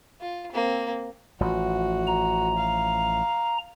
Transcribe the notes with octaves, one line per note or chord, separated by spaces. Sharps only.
F4
A#3 C4
A1 F3 F#4
A#5
F5